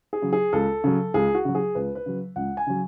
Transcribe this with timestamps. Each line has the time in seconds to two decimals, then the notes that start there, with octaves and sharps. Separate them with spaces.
0.13 G#4
0.22 C#3 F#3
0.32 G#4
0.53 C#2 A4
0.84 C#3 F#3
1.14 C#2 G#4
1.35 F#4
1.45 C#3 F#3
1.55 G#4
1.75 C#2 B4
1.95 B4
2.06 C#3 F#3
2.36 C#2 F#5
2.57 G#5
2.67 C#3 F#3